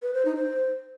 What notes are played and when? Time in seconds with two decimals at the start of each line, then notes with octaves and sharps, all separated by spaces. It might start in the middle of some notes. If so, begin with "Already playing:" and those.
0.02 B4
0.14 C5
0.25 D#4
0.37 C5